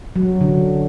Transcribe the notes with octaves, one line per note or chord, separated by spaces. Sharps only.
F#3
D3